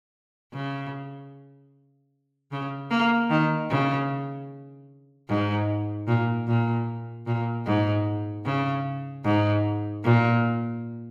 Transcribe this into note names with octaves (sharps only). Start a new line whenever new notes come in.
C#3
C#3
A#3
D#3
C#3
G#2
A#2
A#2
A#2
G#2
C#3
G#2
A#2